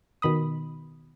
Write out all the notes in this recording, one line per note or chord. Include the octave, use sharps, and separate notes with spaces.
B2 D#3 B5 D#6